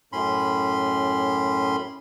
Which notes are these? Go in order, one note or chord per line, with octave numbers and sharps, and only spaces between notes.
F#2 A2 C#4 B5 C6